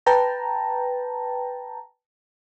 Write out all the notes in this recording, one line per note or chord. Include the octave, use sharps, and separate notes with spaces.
B4 G5 A5 A#5